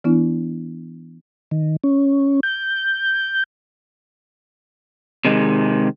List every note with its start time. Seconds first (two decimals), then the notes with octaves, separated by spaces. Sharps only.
0.04 E3 B3 D4 E4
1.51 D#3
1.84 C#4
2.43 G6
5.25 C3 D#3 G#3